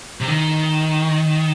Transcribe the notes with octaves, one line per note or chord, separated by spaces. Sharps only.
C3
D#3